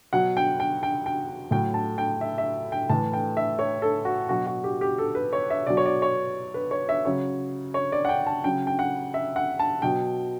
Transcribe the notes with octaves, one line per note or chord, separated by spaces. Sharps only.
B2 F#3 F#5
G5
G5
G5
G5
A2 F#3 G5
A5
G5
E5
E5
G5
A2 E3 A5
G5
E5
C#5
A4
F#4
B2 F#3 F#4
F#4
G4
G4
A4
B4
C#5
E5
B2 F#3 D5
C#5
D5
C#5
B4
C#5
E5
C#3 F#3 C#5
C#5
D5
F#5
G5
A5
C#3 F#3 G5
G5
F#5
E5
F#5
A5
B2 F#3 G5